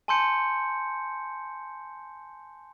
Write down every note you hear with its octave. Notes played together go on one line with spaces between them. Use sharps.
G#5 A5 C6 E6 G6 C#7